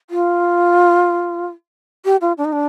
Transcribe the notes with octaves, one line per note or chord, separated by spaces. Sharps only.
F4
G4
F4
D4
D#4
D4